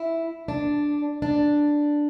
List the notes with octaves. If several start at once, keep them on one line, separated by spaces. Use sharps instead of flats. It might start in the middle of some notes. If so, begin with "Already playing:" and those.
Already playing: E4
D4
D4